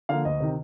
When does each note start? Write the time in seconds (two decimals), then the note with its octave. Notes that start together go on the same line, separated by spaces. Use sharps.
0.09 D3 F3 A#3 F5
0.25 D2 D#5
0.40 C3 D#3